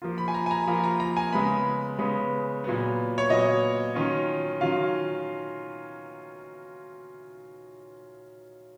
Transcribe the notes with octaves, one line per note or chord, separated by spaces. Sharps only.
F3 A#3 F4
B5
G#5
A#5
G#5
A#5
F3 A#3 F4 B5
A#5
A#5
G#5
C#3 G#3 B3 B5
C#3 G#3 B3
A#2 F#3 B3
C#5
A#2 F#3 B3 D#5
D#3 F#3 C#4 F4
D#3 F#3 C#4 F4 F5